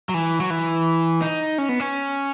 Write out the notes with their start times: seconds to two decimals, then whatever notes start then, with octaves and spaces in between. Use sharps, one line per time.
0.09 F#3
0.14 E3
0.40 F#3
0.50 E3
1.22 D#4
1.58 C#4
1.69 B3
1.80 C#4